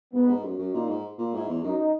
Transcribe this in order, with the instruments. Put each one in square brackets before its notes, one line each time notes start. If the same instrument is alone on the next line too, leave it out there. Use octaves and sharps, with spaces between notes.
[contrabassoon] G#2 [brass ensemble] B3
[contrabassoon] G#2
F#2
F#2
[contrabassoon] A#2 [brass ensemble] D#4
[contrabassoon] G#2
A#2
[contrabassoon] G#2 [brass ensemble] E4
[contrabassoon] E2
[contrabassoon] F#2 [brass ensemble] D#4